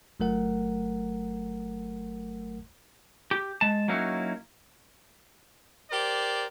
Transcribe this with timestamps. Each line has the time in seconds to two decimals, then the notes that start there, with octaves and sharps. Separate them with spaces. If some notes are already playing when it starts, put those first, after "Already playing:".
0.20 G1 F#3 A3 A#4 F#5
3.31 G4
3.61 G#3 A5
3.88 F#3 A#3 C#4 D#4 E4 F#4
5.91 G4 A#4 C5 D5